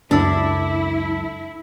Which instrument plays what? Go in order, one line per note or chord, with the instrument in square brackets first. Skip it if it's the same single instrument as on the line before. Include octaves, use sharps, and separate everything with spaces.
[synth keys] C#2 F#2 A4 [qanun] D4 [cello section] E4